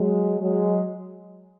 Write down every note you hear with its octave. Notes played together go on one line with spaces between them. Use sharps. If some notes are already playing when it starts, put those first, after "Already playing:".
Already playing: F#3 G#3
F#3 G#3